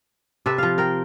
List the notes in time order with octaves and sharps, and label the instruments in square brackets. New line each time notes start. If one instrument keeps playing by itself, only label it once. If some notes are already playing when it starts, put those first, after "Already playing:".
[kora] C3 A4 B4 E5
F3 F5
A#4 G5